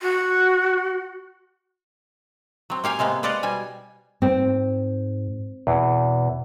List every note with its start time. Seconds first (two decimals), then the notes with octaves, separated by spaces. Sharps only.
0.02 F#4
2.70 F#3 C4
2.84 A#3 G4 F5 G#5
2.99 C3 G#3 A#3 B3
3.23 B4 C5 D5 D#5 F5 F#5
3.43 B2 G3 G#5
4.22 G#2 C4
5.67 E2 B2 E3